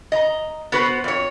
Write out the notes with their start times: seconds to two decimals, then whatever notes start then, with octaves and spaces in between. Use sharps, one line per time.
0.12 D#5 A#5
0.72 B3 F#4 B4 C5
1.04 F2 C#5